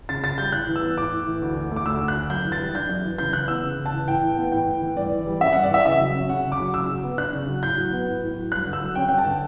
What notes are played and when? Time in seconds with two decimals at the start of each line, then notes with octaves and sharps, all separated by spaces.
0.09 C#3 A6
0.23 C#3 A6
0.38 G3 G6
0.52 A2 F#6
0.68 E3
0.76 E6
0.83 B3
0.98 A2 D6
1.12 A2
1.27 E3
1.42 D2
1.57 D3
1.71 A3
1.76 D6
1.85 D2 E6
2.01 D2
2.08 F#6
2.15 D3
2.30 F#2 G6
2.45 E3
2.52 A6
2.60 G3
2.75 D4 G6
2.89 F#2
3.05 E3
3.18 C#3 G6
3.33 E3 F#6
3.48 B3 E6
3.63 C#3
3.79 C#3
3.86 A5
3.92 E3
4.08 A2 G5
4.22 E3
4.37 B3
4.52 A2 G5
4.67 A2
4.82 E3
4.96 G2 D5
5.11 E3
5.27 G3
5.40 C#4 E5
5.52 G2 F#5
5.63 D5
5.70 E3 E5
5.85 C#3 E5
6.00 F#3
6.15 C#4
6.29 C#3 F#5
6.44 C#3
6.52 D6
6.59 F#3
6.74 C#3 E6
6.89 F#3
7.03 B3
7.18 D4 F#6
7.33 C#3
7.48 F#3
7.63 A2 G6
7.78 F#3
7.92 B3
8.07 A2
8.22 A2
8.37 F#3
8.52 G2 F#6
8.67 D3
8.73 E6
8.81 F#3
8.95 C#4 G5
9.08 G2 G5
9.18 A5
9.25 D3